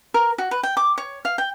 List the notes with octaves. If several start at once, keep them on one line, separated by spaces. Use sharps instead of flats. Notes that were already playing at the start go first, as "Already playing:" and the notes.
A#4
F#4
B4
G5
D6
C#5
F5
G5